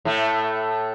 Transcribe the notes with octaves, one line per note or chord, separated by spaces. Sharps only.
A2 A3